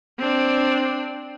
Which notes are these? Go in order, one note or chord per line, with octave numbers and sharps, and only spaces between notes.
C4 D4